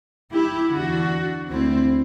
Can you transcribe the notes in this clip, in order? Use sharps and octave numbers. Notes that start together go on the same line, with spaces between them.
E4 G4
E2 D3 D4 F#4
D2 D3 C4 E4